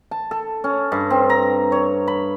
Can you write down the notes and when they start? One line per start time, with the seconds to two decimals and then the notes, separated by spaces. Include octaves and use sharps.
0.11 A5
0.31 A4
0.64 C#4
0.92 G2
1.10 C4
1.30 A#5
1.72 C#5
2.07 B5